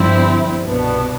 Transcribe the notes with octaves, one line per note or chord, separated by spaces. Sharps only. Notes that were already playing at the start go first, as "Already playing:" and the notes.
Already playing: G1 G2 F3 C4 E4
C2 B2 B3 D4